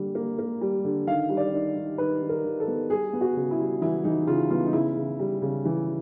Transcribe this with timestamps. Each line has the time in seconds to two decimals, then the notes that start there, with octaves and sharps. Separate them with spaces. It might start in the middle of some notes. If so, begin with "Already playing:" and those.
Already playing: D3 G3 A#3
0.15 A#3
0.39 A#3
0.61 G3
0.85 D3
1.07 D#3 F5
1.29 G3
1.37 D5
1.53 D#3
1.76 D#3
1.98 D#3 B4
2.22 D#3
2.29 A#4
2.45 D#3
2.60 A4
2.68 B3
2.90 G3 G#4
3.13 B3
3.21 F#4
3.37 C#3
3.51 E4
3.59 G3
3.82 E3 E4
4.04 E3 D#4
4.27 C#3 F4
4.50 B3 F4
4.66 D#4
4.73 C#3 E4
4.97 C#3
5.19 G3
5.42 C#3
5.65 E3